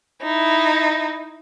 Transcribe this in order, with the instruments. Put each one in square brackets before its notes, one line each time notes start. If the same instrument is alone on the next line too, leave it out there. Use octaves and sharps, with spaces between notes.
[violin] D#4 E4